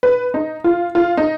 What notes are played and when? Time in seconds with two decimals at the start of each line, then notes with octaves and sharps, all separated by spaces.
0.03 B4
0.34 D#4
0.64 F4
0.95 F4
1.17 D#4